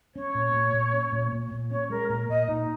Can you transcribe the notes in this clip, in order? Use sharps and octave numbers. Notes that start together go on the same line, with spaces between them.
C#4 C#5
A#2
A#2
A#2
C#4
A#2
A#2
A#2
C#4 C#5
G#3 A#4
A#2 A#4
A#2 D#5
A#2 D#4